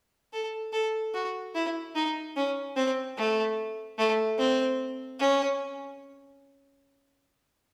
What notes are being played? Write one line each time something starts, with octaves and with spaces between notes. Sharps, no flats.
A4
A4
F#4
E4
D#4
C#4
C4
A3
A3
C4
C#4